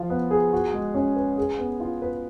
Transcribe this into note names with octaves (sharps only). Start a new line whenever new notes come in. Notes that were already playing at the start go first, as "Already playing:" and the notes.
Already playing: F3 F4
B3
G#4
F#4
G#3
C#4
B4
G#4
B3
F4
B4